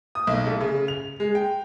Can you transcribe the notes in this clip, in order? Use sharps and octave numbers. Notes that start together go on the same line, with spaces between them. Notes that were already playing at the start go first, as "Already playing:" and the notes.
D#6
B1
A3
C#3
F7
G#3
G5